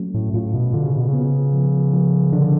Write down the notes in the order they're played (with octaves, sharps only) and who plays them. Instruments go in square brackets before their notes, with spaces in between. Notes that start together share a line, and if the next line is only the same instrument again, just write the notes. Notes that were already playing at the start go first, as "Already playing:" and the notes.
Already playing: [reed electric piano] F#3 A3 C#4
[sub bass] A2
[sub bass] A2 [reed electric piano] F4
[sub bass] B2
[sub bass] D3 [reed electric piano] F4
[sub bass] C#3
B2
[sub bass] C#3 [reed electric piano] B3
[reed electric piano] F3
F3
[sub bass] D3 [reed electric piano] D4